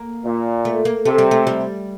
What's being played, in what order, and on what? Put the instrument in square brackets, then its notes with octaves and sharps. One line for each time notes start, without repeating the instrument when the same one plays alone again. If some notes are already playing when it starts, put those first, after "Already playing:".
Already playing: [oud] A#3
[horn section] A#2
[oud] A3
A#3
[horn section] C3 [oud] A3
[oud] G3
A3
G3